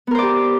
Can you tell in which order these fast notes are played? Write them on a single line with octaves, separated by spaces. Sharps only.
B3 A#4 C5 D5 G4